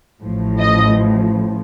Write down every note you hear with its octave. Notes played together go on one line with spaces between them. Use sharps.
A1 A2 F3
D#5